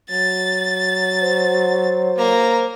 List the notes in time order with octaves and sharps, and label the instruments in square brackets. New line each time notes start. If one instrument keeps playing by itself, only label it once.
[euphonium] F#3 [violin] A6
[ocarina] C5
[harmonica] A#3 [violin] A#5